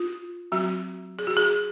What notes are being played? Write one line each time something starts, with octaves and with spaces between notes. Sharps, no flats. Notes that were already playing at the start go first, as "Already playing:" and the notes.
Already playing: F4
F#3 C4 F#4
G#4
F#4
G#4